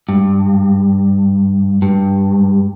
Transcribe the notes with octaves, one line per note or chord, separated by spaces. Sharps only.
G2
G2